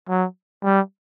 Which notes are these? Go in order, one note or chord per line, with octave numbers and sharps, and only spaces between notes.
F#3
G3